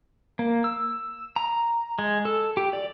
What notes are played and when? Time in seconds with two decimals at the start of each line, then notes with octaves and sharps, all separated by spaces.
0.39 A#3
0.64 E6
1.36 A#5
1.99 G#3
2.25 A4
2.57 G4
2.73 D5